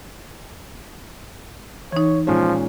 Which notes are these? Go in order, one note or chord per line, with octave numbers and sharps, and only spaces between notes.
E3 D#4 C#5
A#2 F3 G#3 C#4